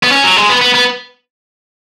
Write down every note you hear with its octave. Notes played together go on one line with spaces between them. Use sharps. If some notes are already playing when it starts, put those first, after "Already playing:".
B3
C#4
F#3
G#3
B3
B3
B3